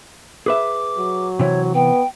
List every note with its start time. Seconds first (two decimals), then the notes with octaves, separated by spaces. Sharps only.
0.46 G#4 B4 E5 D6
0.98 F#3
1.39 C3 E3 C#5
1.75 B3 G5